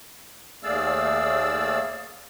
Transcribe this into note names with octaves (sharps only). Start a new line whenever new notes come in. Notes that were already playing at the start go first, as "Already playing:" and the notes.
D#2 A3 G#4 D5 F5 E6